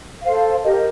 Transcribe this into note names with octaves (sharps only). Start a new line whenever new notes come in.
A4 C5 F5
G4 A#4 D#5